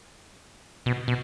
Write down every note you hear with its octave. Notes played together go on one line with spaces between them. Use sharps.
B2
B2